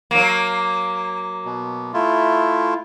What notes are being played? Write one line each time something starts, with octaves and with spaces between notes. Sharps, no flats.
F#3 A#3
B2
A3 E4 F4